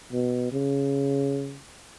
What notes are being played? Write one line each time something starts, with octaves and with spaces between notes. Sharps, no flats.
B2
C#3